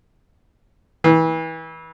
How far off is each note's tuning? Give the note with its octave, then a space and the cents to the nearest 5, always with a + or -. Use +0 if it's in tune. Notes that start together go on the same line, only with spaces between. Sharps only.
E3 -25